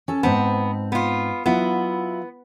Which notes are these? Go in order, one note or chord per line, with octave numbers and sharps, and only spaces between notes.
C#4 A4
G#2 B3 C4 A5
B3 F4
F#3 B3 E4 F4